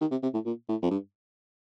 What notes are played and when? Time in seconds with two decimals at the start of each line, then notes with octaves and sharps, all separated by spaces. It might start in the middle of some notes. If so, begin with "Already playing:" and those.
0.01 D#3
0.11 C3
0.23 C3
0.34 A2
0.46 A#2
0.69 A2
0.83 F2
0.91 G2